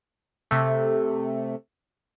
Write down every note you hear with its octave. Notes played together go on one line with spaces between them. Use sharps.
C3 A3